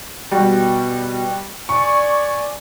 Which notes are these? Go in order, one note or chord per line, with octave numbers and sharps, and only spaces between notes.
B2 G3 F#4
D5 G#5 C#6